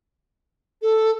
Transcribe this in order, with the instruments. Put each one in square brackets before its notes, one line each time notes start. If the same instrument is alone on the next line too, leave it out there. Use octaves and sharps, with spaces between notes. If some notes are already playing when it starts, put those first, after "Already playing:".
[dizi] A4